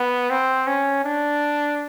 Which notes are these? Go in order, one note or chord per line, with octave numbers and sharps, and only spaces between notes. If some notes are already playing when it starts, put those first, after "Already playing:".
Already playing: B3
C4
C#4
D4